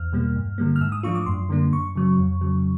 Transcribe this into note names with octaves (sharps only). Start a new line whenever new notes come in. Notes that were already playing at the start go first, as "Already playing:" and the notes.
Already playing: E2 F6
B2 G3 A#3
G2
D3 G3 A#3
F6
G#2 E6
D#6
F3 A3 D4 F4 C#6
D6
F#2 C6
D3 G3 A#3 D4
F#2 C#6
C#3 F#3
F2
C#3 F#3